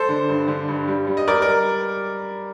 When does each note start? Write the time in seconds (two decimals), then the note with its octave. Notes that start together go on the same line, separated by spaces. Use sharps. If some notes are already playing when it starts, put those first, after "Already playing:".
Already playing: A4 C5
0.09 D3
0.29 G2
0.48 D3
0.68 G2
0.88 G3
1.07 G3
1.17 D#5
1.28 G3 A#4 D5
1.42 A#4